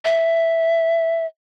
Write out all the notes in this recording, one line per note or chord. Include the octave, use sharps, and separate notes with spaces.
E5